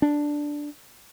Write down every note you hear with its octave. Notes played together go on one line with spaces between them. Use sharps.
D4